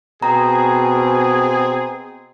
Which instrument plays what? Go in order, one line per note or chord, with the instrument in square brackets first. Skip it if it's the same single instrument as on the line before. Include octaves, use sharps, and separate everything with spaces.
[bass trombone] B2 [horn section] C4 G#4 [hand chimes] A#5